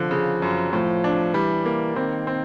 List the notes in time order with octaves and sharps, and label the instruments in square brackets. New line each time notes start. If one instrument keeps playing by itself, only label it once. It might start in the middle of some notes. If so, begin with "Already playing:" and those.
Already playing: [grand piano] D3 [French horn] F3
[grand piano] C#3
F#2
[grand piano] A2 [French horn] F3
[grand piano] D4
[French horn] E3 [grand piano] G3
[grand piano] A#3
[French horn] D#3 [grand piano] C4
[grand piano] C4